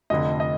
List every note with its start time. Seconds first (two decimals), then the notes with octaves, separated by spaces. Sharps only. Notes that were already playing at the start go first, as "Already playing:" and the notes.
0.10 F1 F2 D3 D#5
0.40 D#5